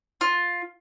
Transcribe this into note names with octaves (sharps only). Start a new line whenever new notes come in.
F4